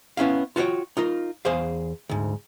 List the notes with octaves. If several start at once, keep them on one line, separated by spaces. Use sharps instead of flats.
B3 C#4 E4 F5
F4 F#4 B4 C#5 G5
D#4 F4 A#4
E2 G#4 C5 F5
D2 G#2